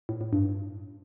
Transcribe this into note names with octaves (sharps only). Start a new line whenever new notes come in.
A2
A2
G2